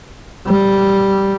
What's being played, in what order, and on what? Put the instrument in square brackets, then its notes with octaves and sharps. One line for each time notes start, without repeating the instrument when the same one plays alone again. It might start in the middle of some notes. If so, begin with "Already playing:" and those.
[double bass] G3